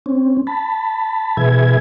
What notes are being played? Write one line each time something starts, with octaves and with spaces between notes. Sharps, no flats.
C4 C#4
A5 B5
B2 E3 G#4 B4 E5 G#6